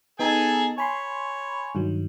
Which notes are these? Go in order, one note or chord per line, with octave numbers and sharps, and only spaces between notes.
B3 D#4 G#4 A4 G#5 A#5
C#5 G#5 B5 C6
G2 D#3 F#3